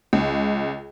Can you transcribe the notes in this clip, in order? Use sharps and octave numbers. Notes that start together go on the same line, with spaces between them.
C#2